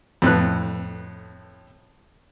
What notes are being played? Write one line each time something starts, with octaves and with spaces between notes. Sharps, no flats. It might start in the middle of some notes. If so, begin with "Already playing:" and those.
F2 A2 B4 F#6